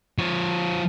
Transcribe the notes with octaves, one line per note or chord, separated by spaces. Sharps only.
F3 C#5